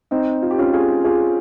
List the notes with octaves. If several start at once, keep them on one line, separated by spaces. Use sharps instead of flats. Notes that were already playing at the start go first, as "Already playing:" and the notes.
C4 D#4
F4
G4
C#4 F4
F4 G#4
F4 G#4